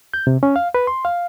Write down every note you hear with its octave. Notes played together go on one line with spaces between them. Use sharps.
G6
C3
C#4
F5
B4
C6
F5